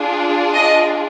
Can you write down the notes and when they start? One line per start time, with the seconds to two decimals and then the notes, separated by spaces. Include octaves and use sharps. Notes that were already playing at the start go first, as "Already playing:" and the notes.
Already playing: D4 F4 G#4
0.55 D#5